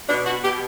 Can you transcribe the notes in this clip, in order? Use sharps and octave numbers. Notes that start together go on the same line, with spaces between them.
B2 D4
F#4
B2 G4